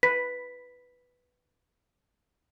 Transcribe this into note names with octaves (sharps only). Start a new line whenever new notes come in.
B4 B6